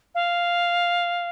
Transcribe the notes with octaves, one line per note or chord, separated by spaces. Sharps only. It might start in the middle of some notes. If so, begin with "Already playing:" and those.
F5